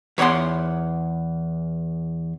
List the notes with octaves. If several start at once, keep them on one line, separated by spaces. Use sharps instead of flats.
E2 C#5 D5 F#5 C6